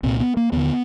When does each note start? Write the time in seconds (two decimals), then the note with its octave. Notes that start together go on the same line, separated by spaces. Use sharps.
0.03 C2 A#2 C4
0.20 B3
0.37 A#3
0.52 D#2 D3 B3